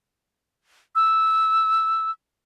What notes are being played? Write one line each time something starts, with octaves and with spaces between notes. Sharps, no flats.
E6